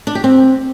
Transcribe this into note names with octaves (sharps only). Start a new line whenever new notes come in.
D4
G4
C4